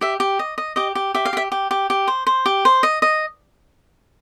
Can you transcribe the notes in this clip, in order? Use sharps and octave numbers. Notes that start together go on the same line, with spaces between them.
G4 E5
G4
D#5
D#5
G4 D#5
G4
G4 E5
F5
G4 E5
G4
G4
G4
C5
C5
G4
C5
D#5
D#5